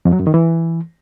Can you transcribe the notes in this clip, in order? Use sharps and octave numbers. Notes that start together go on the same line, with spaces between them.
F2
F#3
F#2
D#3
E3